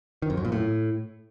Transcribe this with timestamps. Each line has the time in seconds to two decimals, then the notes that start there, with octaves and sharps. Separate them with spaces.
0.22 D#3
0.30 F2
0.37 F#2
0.45 A#2
0.52 A2